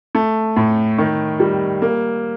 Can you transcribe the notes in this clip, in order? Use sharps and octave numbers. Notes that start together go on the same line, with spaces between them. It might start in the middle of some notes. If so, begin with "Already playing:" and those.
A3
A2
D#3
G3
A#3